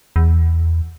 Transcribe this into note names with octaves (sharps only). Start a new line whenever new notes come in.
E2